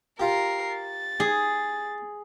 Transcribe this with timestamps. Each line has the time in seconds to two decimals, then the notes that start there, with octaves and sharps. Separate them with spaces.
0.20 F4 G4 A#4 C7
0.75 A6
1.20 G#4